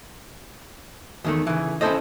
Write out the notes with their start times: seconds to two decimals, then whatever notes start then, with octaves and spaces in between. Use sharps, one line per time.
1.24 E2 D#3 A3
1.47 C#3 E3
1.81 C#4 E4 F#4 A4 C5 D#5